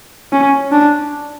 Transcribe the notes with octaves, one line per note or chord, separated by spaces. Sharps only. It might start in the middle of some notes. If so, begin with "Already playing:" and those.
C#4
D4